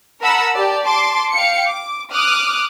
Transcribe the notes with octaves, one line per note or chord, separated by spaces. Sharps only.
A#4 F#5 A5 B5 E6
G4 D5 A5
A5 C6 D6
F5 G5 C#7
D6
D6 D#6 F6 F#6